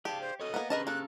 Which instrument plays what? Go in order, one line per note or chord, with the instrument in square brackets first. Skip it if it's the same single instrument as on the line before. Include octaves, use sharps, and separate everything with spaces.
[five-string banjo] G4 [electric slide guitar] G#4 D5 F5 [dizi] A5
[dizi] C5
[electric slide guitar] F#4 A4 C#5 [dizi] D#5
[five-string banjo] A#3 B3
[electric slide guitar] C#4 G4 G#4 [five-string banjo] A#4 D#5 A5 [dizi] B4
[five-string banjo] A#3 A4 [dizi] F#6